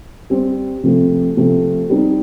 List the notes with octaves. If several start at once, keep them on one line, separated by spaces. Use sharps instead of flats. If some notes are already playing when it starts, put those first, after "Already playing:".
G3 C4 G4 C5
C3 F3 A3 C4
C3 F3 A3 C4
G3 C4 D#4